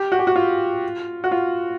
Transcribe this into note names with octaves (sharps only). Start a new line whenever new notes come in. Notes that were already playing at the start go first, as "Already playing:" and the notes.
Already playing: G4
F#4
G4
F#4
F4
F#4
F4